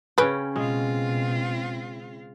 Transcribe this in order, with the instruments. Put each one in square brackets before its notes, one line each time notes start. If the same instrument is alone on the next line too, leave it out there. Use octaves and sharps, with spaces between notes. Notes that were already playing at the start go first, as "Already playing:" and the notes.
[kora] C#3 C#4 G5 [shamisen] G#4 B4
[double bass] B2 [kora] G#3 [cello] C4 F4